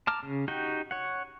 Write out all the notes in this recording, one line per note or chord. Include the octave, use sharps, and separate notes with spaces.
A5 A#5 D6 F6
C#3
D#4 F#4 G4 G5
C#5 F#5